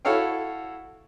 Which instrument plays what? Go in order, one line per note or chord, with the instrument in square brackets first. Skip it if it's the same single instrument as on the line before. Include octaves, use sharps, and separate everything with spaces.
[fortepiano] E4 F#4 A4 C#5 F5 G5